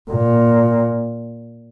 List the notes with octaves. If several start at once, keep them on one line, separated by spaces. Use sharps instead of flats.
A#2